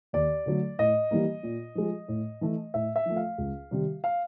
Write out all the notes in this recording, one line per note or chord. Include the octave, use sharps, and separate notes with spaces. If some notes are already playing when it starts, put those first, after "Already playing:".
D#2 D5
D3 F#3 A3
A2 D#5
E3 G3 A#3
A#2
F3 G#3
A2
E3 A3
A2 E5
E5
F3 A3
F5
C#2
C3 D#3 G3
F5